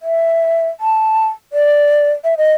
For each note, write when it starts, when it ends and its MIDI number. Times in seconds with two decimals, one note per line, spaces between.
0.01 0.67 76
0.80 1.27 81
1.53 2.10 74
2.24 2.34 76
2.38 2.54 75